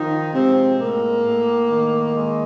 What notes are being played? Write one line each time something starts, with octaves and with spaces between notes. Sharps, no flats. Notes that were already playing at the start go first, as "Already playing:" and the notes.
Already playing: D#3 F3 D#4
C3 G#3 C4
A2 A#3
A2
D#3
G#3